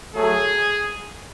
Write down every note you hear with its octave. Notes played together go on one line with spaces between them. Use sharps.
F#3 A3 G#4